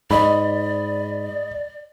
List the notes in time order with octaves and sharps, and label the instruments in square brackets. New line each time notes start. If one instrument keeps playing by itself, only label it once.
[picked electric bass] G#2 [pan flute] D5 [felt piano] D#5 B5